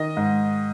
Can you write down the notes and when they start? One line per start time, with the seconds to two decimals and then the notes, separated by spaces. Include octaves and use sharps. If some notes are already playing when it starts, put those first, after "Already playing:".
Already playing: D#3 D#5
0.17 G#2